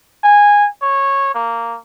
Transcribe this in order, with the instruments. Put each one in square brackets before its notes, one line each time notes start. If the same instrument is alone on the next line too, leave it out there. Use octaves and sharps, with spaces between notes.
[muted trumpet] G#5
C#5
A#3